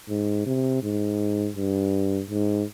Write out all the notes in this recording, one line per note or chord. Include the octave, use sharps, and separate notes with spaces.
G#2
C3
G#2
G2
G#2